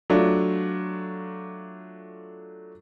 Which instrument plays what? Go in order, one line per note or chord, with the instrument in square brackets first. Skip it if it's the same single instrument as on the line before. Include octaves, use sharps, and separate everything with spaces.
[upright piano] F#3 A3 D4 F4